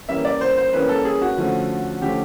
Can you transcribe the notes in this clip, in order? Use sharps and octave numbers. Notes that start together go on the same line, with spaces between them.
E3 G3 A#3 C#4 E5
D5
C5
C5
E3 G3 A#3 C#4 B4
A4
G#4
F#4
D3 F3 A3 C#4
D3 F3 A3 C#4 G4